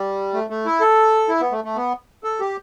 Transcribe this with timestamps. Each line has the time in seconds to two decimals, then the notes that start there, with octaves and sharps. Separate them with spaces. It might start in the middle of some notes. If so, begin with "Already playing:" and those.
Already playing: G3
0.34 A3
0.50 A3
0.66 E4
0.81 A4
1.29 E4
1.41 B3
1.52 A3
1.64 A3
1.76 B3
2.24 A4
2.40 G4